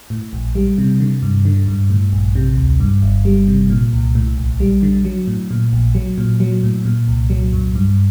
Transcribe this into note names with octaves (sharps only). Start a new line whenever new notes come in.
A2
A#1
G3
C3
D3
G2
D3
G2
A2
A#1
C3
D2
G2
G1
G3
C3
A#2
C2
A2
A#1
G3
D3
F#3
A2
A#2
A#1
F#3
A#2
F#3
A2
A#2
C2
F#3
F#2
G2